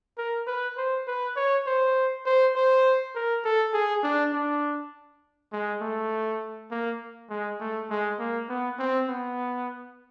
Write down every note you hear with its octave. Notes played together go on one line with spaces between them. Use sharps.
A#4
B4
C5
B4
C#5
C5
C5
C5
A#4
A4
G#4
D4
D4
G#3
A3
A#3
G#3
A3
G#3
A#3
B3
C4
B3